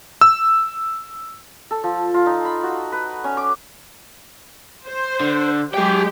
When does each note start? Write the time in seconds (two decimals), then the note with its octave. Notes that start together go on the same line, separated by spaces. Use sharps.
0.21 E6
1.71 A4
1.84 F3
2.14 F4
2.26 D#4
2.45 B5
2.63 F#4
2.92 B4
3.24 C#4
3.37 D6
4.87 C5
5.20 D3
5.74 F#3 G#3 G4 G#4 G5